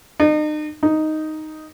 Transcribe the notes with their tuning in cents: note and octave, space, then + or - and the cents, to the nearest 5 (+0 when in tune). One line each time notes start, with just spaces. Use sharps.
D#4 -40
D#4 +0